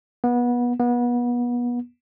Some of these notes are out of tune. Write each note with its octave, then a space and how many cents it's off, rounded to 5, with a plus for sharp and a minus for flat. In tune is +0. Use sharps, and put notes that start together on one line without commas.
B3 -25
B3 -30